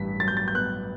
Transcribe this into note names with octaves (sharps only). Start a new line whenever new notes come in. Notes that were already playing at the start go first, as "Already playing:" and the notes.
Already playing: A1 G2 B6
F#3 A6
G6
A6
G6
B3 F#6